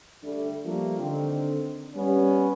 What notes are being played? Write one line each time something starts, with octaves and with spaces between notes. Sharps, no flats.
D3 G3 A3
F3 G3 A3 A#3
D3 D#3 C4
G3 B3 C#4